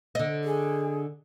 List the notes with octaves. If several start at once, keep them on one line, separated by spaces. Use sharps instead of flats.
D3 D#5
G#4